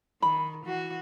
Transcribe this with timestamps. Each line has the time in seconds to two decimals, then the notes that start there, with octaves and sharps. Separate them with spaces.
0.22 D#3 B5
0.65 E3 F#4